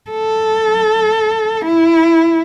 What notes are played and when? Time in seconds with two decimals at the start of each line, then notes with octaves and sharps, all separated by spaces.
0.10 A4
1.65 E4